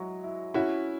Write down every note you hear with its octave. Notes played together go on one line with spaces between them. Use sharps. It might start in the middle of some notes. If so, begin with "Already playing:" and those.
Already playing: F#3 G#3 E4
E4
C#4 E4 F#4